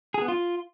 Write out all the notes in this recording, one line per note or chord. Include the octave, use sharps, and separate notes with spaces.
G#4
B3
F4